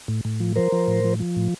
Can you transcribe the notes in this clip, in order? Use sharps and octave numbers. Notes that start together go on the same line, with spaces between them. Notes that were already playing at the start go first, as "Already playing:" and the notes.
A2
A2
F3
F3 A#4 C5
F3
A2
F3
F3
A2